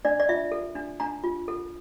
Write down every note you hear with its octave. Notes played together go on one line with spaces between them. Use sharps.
D4 D5
D5
F4 E5
A4
D4
D4 A#5
F4
A4